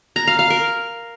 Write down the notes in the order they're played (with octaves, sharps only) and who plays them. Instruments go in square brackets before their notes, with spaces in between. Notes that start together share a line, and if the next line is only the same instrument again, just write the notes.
[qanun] A#5
F5
F5
A#4